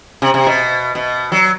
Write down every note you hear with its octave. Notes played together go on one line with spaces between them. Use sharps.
C3
C3
B2
B2
F#3